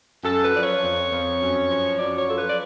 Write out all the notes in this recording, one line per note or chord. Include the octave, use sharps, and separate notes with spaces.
F#2 A4
B4
F3 D5
C#5
F2
F2
F#2
F3
F#2 D5
C#5
F3 A4
B4
D5